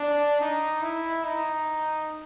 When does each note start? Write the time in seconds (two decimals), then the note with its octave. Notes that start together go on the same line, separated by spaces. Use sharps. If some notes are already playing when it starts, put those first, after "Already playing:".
Already playing: D4
0.41 D#4
0.82 E4
1.24 D#4